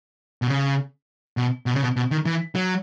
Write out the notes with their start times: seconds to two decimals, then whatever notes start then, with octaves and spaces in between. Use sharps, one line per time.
0.42 B2
0.48 C#3
1.37 B2
1.66 B2
1.74 C#3
1.82 B2
1.96 B2
2.11 D#3
2.26 E3
2.55 F#3